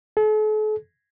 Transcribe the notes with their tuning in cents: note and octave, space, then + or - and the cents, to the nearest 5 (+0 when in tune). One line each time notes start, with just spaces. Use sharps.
A4 -45